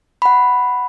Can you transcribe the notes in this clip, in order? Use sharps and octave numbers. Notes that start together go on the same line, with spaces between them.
F#5 B5